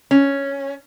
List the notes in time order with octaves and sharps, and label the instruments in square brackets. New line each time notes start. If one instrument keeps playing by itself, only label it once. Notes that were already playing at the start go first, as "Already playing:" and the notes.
[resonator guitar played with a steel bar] C#4